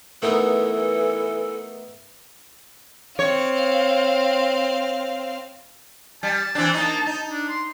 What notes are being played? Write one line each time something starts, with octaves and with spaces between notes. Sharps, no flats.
E3 A3 B3 D#4 A4 A#4
C4 C#5 F5
G3 A5
E3 C4 D4
A#3 D#4
D#4
D4
C6